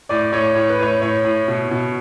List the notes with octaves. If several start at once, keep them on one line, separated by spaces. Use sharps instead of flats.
A2 D5
A2 C#5
A2 C#5
B4
A2 C#5
A2 C#5
A2
B2
B2